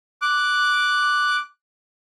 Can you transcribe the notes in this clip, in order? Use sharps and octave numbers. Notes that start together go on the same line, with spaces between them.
D6 F#6